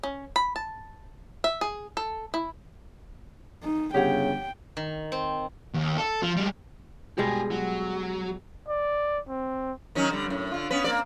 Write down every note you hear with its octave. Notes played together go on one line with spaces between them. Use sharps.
C#4
B5
A5
E5
G#4
A4
E4
D#4
G1 C#3 G4 C#5 F#5 G5
D#3
C4
D#2
A4
F3
G3 G#3
B2 G3 G#3 G4 G#4
F#3
D5
C4
D#3 F#3 C#4
D3 G3
F#2 A2
D3 F4
B3 C#4 B4
A#3 C4 D5